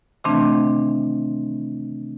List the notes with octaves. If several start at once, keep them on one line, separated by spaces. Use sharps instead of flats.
C3 D#3 E3 A3 C4 D4